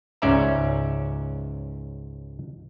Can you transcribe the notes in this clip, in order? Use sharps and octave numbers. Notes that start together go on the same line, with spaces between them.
C#2 G#2 C#4 D5 E5 A#5